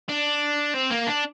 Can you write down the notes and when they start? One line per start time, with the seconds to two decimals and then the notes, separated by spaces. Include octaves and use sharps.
0.09 D4
0.74 C4
0.90 A#3
1.07 D4